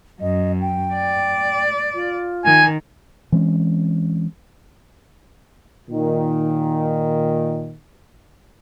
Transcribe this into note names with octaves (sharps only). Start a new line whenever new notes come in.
F#2 D#5
G5
D5
F4
D#3 G#5
E3 G#3 C4 C#4
A#2 D#3